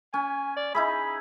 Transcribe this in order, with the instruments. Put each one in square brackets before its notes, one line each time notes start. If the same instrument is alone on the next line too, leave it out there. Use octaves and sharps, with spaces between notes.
[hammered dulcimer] C#4 [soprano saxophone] G#5
[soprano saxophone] D5
[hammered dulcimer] D#4 E4 G#4 [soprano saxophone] B5